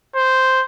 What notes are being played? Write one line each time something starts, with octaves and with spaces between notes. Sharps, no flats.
C5